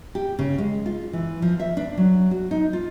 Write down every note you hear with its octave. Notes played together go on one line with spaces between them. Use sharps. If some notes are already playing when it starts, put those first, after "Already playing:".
G4
C#3
G#3
F4
E3
F3
E5
D4
F#3
F#4
D#4
F4